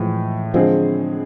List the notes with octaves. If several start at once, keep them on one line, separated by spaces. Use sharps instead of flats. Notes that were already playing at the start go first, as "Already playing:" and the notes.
Already playing: A2 E3 F3 G#3
D3 F3 G#3 C4 G#4